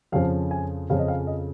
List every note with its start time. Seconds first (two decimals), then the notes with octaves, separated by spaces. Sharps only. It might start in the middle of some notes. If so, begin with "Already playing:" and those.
0.12 F2 C#3 F3 C#4 F5
0.51 G#5
0.90 F2 C#3 F3 C#4 F5
0.99 D#5
1.08 F5
1.27 D#5